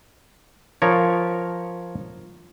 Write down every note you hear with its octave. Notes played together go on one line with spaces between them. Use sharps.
F3 A#4 C#5